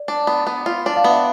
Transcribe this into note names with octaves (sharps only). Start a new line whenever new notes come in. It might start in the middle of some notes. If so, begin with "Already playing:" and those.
Already playing: D5
D4
B3
B3
F4
D4
F5
B3
E5